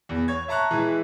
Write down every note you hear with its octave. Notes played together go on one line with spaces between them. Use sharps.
E2
C#5 G#6
E5 A5 A#5 C#6 F#6
E3 G#3 E4